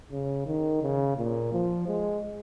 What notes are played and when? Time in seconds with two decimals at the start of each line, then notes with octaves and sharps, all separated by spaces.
0.12 C#3
0.46 D#3
0.82 C#3
1.17 A#2
1.52 F3
1.88 G#3